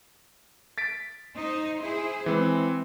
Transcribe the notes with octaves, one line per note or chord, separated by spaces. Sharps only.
A6 B6 D7
D#4 C5 D#5
E4 G#4 C5
E3 G#3 C4